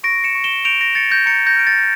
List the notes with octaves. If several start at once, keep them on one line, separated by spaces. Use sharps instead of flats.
C#6 A#6 D7
C#7 E7
C#6
E7 G7
G6 D7 F7
A#6 D7
G6 A6 C#7
G6 A#6
A#5 A6 C#7
G6 A#6
F6 D7
A6 C#7